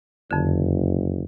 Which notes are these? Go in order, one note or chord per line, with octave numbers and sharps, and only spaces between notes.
F#1 F2 D3